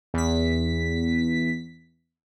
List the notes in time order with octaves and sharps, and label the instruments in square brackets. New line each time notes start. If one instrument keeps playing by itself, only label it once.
[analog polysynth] E2 B6